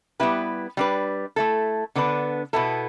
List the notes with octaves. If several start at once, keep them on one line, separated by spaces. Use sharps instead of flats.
G3 B3 E4 G4 B4
G3 D4 B4
A3 E4 A4
D3 B3 D4 B4
B2 B3 E4 A4